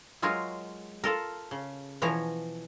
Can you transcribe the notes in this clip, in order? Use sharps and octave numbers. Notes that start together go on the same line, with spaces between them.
F#3 G#3 F4 A#4 C#5
F4 A4 A#4
C#3
B2 E3 F3 C#5 G#5 A#5